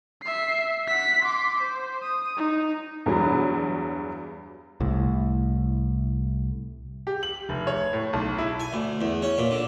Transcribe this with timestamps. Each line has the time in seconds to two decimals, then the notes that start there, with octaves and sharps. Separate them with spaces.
0.23 E5 C7
0.88 F#5 B6
1.23 C6 D6
1.59 C5
2.03 D#6
2.37 D#4
3.06 E2 G2 F#3
4.80 C2 A2
7.07 G4
7.23 F#7
7.49 F1
7.67 C#5
7.93 A2
8.13 B1
8.38 E4
8.60 G#5
8.73 D2
9.01 E2
9.22 C#4
9.38 A#2
9.51 D3